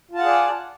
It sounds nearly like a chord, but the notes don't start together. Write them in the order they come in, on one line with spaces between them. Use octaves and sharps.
F4 A5 F#5 G#4 D5